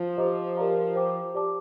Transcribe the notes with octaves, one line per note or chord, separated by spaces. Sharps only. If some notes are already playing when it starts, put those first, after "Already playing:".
Already playing: F3
G4 C5 D#5 A#5 D6
G4 A#4 D5 F5 A#5
C5 G5 D6
G4 D5 A5 D6